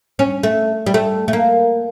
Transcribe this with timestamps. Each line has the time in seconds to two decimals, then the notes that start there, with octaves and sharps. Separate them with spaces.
0.19 C#4
0.43 A3
0.86 G3
0.94 A3
1.28 A3
1.33 A#3